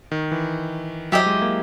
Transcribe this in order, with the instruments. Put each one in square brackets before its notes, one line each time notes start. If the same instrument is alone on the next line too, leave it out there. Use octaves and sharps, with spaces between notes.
[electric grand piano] D#3
E3
[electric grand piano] F#3 [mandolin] E4 G4 C5 D#5
[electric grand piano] G#3
A#3